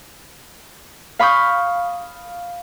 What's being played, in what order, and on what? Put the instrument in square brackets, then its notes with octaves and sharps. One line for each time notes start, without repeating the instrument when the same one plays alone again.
[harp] F5 B5 C#6 D#6 G6